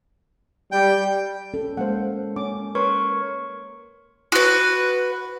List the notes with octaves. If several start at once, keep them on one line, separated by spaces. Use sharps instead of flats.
G3 G5
C#4 A4
G#3 A#3 C5 F5 F#5
C#4 D6
A#4 B4 C#5 C6 C#6
F#4 B4